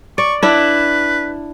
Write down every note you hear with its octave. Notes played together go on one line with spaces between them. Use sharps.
D5 C#6
D4 E4 B4